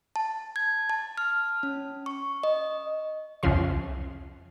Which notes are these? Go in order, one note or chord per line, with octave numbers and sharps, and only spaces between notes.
A5
G#6
A5
F6
C#4
C#6
D#5
C2 F2 C#3 F3 C6